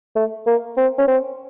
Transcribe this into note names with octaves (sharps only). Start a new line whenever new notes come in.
A3
A#3
C4
C#4
C4